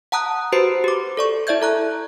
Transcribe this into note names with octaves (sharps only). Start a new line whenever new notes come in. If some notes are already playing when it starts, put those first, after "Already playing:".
F#5 A5 A#5 D#6 F#6
F#4 G4 B4 C5 C7 D7
G4 D6
A4 D5 C#6
E4 D5 E5 G6 G#6
A4 A#5 F#6